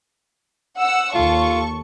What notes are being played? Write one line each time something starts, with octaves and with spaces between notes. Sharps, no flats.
F#5 E6
D#2 F4 A4 C#6